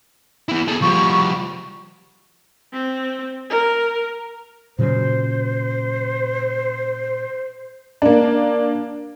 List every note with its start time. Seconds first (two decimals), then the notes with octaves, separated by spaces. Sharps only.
0.49 B3 E4
0.68 G#4 A4
0.82 F3 G3 C#6
2.73 C4
3.49 A#4
4.79 A#2 C#3 F#3 C5
8.02 A#3 D4